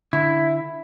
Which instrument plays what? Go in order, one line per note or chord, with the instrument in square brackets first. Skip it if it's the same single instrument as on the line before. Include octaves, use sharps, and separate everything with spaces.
[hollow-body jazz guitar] D3 [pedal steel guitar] E4